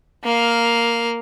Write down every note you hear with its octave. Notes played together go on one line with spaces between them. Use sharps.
A#3 F5